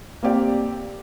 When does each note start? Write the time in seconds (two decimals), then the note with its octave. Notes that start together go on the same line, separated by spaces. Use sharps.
0.23 A#3 C4 G4 D5